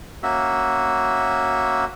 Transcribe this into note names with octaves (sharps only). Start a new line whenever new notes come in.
A#3 C#4 F#4 E5